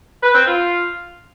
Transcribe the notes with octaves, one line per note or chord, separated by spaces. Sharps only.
B4
C4
F4